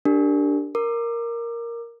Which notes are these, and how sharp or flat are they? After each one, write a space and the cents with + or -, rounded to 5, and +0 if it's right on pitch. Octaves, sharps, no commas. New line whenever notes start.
D4 +0 G4 +0 A#4 -25
A#4 +0 D6 +25